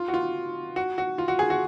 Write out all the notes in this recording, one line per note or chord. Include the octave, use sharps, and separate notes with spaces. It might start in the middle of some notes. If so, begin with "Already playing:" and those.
Already playing: F4
F#4
F4
F#4
F#4
F4
F#4
G#4
F#4